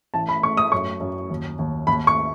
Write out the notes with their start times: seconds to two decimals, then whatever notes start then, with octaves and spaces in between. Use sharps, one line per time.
0.14 A1 A5
0.29 B5
0.43 A3 C#6
0.57 D#6
0.72 F#2 C#6
1.00 F#2
1.30 D#2
1.59 D#2
1.87 D#2 B5
2.07 C#6